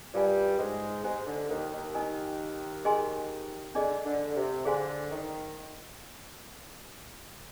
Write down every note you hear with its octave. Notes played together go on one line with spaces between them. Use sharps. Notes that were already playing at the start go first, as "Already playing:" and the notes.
G2 G3 F4 A#4 D5 F5 G#5
G#2 G#3
G#2 G#3 D#4 G4 C5 D#5 G#5
D3
D#2 D#3
D#2 D#3
D#4 A#4 D#5 G#5
G#4 D#5 G#5 C6
D3 D4 G#4 D#5
D3
C3
D3 G#4 C5 F5 G#5 C6
D#3